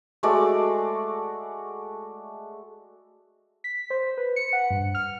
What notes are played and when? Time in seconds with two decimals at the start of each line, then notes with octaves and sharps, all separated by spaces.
0.23 G#3 A3 F#4 D5
3.64 B6
3.90 C5
4.17 B4
4.36 C#7
4.53 F#5
4.70 G2
4.95 F6